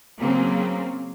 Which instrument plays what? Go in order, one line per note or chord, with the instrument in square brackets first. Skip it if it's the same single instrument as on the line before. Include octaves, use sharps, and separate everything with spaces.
[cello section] C#3 F#3 A#3 C4 C#4